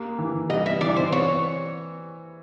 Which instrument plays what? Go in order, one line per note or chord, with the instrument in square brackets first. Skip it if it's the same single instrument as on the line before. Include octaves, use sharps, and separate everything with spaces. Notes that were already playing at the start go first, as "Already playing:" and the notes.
Already playing: [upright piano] A#3 G4
E3
[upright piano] G3 [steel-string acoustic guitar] D#5
[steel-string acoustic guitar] E5
[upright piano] E3 [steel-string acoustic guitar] D5
[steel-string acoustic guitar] C5
[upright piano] C4 [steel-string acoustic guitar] C#5